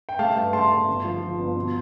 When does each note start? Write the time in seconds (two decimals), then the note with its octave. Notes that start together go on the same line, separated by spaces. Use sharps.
0.09 G5
0.19 A3 F5 A5
0.36 G2
0.53 A3 A5 C6
0.70 A3
0.87 G1
1.05 F3
1.22 F3
1.39 G1
1.56 B2